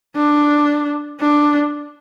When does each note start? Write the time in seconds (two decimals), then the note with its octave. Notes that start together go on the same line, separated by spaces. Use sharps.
0.16 D4
1.20 D4